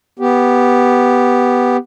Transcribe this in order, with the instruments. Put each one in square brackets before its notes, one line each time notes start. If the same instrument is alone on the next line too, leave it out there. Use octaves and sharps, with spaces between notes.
[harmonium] B3 G4